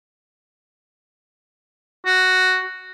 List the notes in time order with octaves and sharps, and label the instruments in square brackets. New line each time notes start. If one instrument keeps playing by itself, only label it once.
[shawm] F#4